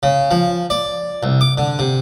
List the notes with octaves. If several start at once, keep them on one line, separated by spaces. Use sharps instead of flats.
C#3
F3
D5
C2
D6
D3
C3